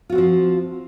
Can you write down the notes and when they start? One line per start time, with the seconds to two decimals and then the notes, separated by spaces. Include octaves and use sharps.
0.09 F4
0.12 F#4
0.15 C4
0.18 F3